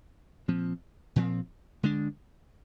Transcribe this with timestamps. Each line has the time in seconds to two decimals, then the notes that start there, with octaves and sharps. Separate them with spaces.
0.48 A#2 F3 C4
1.16 A#2 F3 C4
1.83 D3 G#3 D4